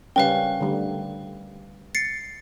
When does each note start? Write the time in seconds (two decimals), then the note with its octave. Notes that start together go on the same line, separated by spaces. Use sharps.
0.16 C#3 G3 C#4 A#4 B4 F5 G5
0.61 D3 G3 A3
1.95 A6 C7 C#7